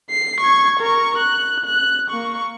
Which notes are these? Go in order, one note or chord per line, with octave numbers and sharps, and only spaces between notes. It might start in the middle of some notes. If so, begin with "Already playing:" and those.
C7
C#6 G#6
A#4 C#6
F#6
F#6
A#3 C#6